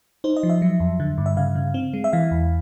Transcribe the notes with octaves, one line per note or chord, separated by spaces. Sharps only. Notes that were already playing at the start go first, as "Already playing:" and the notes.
D#4 C5
D#5
F3
E5
F#3
F2
D3
G2
E5
C#3 F5
C#3
C4
G#3
E5
E3 F5
E2